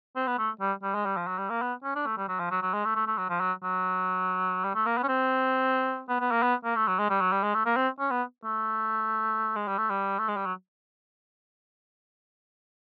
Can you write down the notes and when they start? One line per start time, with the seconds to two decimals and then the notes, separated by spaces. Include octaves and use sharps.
0.16 C4
0.27 B3
0.38 A3
0.61 G3
0.83 G3
0.94 G#3
1.06 G3
1.17 F3
1.28 F#3
1.39 G3
1.50 A#3
1.62 B3
1.84 C#4
1.96 D4
2.06 A3
2.18 G3
2.28 F#3
2.40 F3
2.51 F#3
2.62 F#3
2.74 G#3
2.85 A3
2.96 A3
3.07 A3
3.18 F#3
3.29 F3
3.41 F#3
3.63 F#3
4.64 G3
4.75 A3
4.86 A#3
4.98 B3
5.03 C#4
5.08 C4
6.09 B3
6.20 B3
6.31 A#3
6.43 B3
6.65 A#3
6.76 A3
6.88 F#3
6.99 G#3
7.10 G3
7.21 F#3
7.32 G3
7.43 G#3
7.55 A3
7.66 A#3
7.76 C4
7.99 C#4
8.11 B3
8.44 A3
9.56 G#3
9.68 G3
9.78 A3
9.90 G3
10.19 A3
10.28 G#3
10.37 G3
10.46 F#3